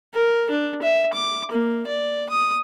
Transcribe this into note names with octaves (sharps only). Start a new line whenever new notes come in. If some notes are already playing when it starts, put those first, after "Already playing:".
A#4
D4
E5
D6
A#3
D5
D#6